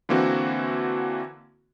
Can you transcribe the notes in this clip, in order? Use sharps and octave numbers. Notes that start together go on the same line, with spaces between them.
D3 E3 A#3 C4 F#4